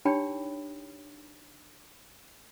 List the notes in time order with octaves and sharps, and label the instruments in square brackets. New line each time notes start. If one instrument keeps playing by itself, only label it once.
[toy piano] D4 D#4 G4 C#5 G5 B5